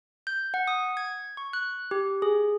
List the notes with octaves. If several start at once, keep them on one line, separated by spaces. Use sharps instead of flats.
G6
F#5
D#6
G#6
C#6
F#6
G4
G#4